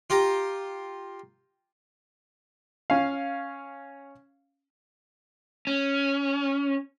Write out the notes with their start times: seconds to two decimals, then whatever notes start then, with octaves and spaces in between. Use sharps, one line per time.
0.10 F4 G4 A#5
2.90 C#4 F5
5.67 C#4